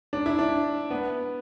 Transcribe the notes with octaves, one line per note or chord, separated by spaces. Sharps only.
D4
E4
D4
B3